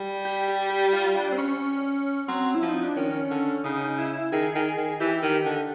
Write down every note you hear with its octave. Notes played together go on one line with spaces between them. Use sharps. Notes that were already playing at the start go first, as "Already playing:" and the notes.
Already playing: G3
G4
G4
G4
F4
D4
C4
C#4
F#3 C4
E4
F3
D#4
D4
D#3 C#4
D3
C#3 D#4
E4
D#3 G#4
D#3
D#3
E3 G4
D#3
D3